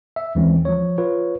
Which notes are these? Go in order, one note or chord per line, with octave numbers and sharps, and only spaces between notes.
E5
D#2 E3 G#3 C4 C#4
F3 C#5
F4 B4 C#5